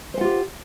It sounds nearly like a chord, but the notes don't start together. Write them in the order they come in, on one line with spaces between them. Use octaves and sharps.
C5 F#5 F4 G4